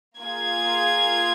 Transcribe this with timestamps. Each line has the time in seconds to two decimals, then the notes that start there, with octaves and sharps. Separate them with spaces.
0.21 A#3 F4 G#4 G#6